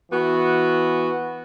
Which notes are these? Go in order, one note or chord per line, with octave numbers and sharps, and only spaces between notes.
E3 B3 F#4